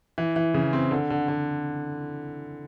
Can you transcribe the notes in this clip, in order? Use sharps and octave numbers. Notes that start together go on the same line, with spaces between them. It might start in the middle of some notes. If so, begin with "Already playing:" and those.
E3
E3
C#3
C4
D3
D3
D3